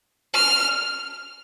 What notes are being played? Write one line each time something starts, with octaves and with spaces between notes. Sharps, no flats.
F6